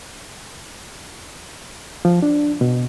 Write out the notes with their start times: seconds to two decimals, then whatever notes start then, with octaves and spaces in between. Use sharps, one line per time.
2.05 F3
2.22 D4
2.61 B2